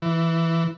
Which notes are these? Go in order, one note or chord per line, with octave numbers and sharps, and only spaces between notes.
E3